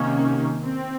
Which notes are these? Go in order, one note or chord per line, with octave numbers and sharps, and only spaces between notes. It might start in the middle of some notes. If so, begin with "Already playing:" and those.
Already playing: C3 D#3 A#3 C#4
C4